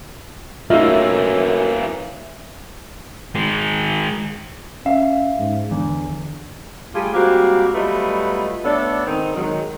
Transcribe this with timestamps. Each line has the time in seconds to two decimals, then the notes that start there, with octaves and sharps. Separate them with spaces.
0.70 F#2 E3 A3 A#3 D#4 F4 E5
3.35 D#3 G#3
4.86 C#4 E5 F5
5.39 G#2
5.71 E2 D3
6.94 G3 A3 F4 G4 G#4
7.14 G3 G#3 A#3 C4 F#4 G4
7.74 F#3 G3 A3 B3 F4 D#5
8.64 A3 B3 D4 A4 C#5 D5
9.06 G#2 D#3 C4 D#4
9.36 D#3 F#3 G#3